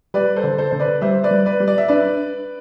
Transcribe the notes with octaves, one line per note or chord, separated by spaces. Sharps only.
G3 B4 D5
A4 C5
D3
A4 C5
D3 C5
B4 D5
G3 C5 E5
B4 D5
G3
B4 D5
G3
D5
E5
D4 B4 D5